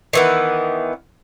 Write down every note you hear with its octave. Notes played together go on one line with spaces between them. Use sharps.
D#3 E3 B3